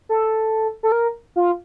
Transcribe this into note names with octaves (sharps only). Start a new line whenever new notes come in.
A4
A4
A#4
F4